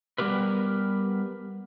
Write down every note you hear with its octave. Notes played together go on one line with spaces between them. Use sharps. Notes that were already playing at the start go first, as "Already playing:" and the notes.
G3 B3 G4 A#4 B4